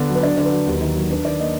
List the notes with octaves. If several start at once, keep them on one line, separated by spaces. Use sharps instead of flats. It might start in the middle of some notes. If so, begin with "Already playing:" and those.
Already playing: D3 B3 D4
F#3
B4
D4 D5
D3 D5
B4
F#3
D#2
D#3
F#3
D4 B4
D#3 D5
A#3 D#5